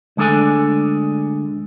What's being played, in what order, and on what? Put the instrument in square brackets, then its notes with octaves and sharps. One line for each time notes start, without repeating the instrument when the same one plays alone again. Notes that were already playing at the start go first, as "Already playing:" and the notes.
[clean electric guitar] D2 G#3 D4 A4 G#5